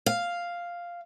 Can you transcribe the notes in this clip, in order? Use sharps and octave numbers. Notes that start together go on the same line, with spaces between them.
F5